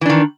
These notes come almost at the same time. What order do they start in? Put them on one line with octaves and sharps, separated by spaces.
E3 D4 D#3